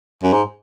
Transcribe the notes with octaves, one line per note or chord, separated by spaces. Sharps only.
F#2
G#2